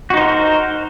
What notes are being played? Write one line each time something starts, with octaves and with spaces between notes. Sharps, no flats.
D#4 F#4 A#4 C5